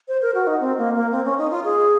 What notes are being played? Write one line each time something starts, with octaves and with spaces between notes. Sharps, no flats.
C5
A#4
F#4
D#4
C4
A#3
A#3
C4
C#4
D#4
F4
G#4